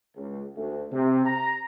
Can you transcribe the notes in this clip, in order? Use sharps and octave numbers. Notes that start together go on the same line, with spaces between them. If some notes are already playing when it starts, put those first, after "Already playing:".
C#2
D2
C3
A#5